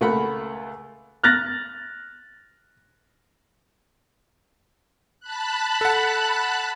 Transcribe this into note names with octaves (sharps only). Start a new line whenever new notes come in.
C#2 A3 A#4 F#5 B5
F6 F#6 A6 A#6
A5 B5 F#6
A4 F#5